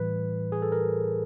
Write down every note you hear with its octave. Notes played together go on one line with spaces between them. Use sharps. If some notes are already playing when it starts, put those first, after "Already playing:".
Already playing: A2 E3 G3 B4
G#4
A4
A#4